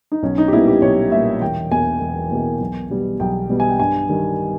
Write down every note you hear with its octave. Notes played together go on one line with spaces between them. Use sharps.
D#4
B1 C#4
D#4
G4
A#2 G3 B3 E4
G4
B1 C#5
A#2 G3 B3 E5
E1 G5
E2 B2 A#3 G#5
E1
E2 B2 A#3
B1
B2 G3 B3
B1 G5
B2 G3 B3
G#5
G5
G2 G#5
D#3 G3